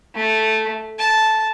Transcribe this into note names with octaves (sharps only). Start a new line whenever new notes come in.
A3
A5